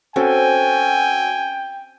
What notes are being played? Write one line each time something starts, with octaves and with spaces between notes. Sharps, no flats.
C4 C#4 F#4 A4 G5 G#5